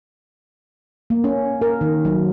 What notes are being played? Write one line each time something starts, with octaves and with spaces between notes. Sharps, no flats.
A#3
C#4
A#4
D#3
F#3